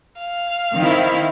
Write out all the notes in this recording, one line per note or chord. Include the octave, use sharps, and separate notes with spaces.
F5
D#3 C4 E4